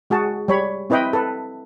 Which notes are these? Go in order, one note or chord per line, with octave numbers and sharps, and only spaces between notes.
G#3 F#4 G#4 A5
G3 C#5 B5
C4 E4 B4 D#5 G5 B5
A4 B4